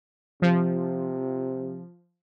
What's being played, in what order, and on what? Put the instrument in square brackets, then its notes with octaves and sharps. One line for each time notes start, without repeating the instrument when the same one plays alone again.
[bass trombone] C3 [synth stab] F3